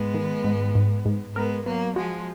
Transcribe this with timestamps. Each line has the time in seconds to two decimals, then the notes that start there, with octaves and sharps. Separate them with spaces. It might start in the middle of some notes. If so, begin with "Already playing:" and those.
Already playing: G#2 G#3 B3
0.14 D#3
0.44 G#2
0.75 G#2
1.05 G#2
1.35 G#3 B3 A#4
1.66 F#3 A#3 B3
1.96 F3 G#3 F#4